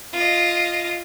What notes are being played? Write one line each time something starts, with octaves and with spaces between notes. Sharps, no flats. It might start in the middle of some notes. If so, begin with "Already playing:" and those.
F4 D#5